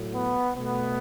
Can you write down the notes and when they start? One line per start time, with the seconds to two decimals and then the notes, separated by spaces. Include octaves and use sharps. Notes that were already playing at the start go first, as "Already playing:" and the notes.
Already playing: A2 F#3 A3
0.14 B3
0.56 B2 A3 B3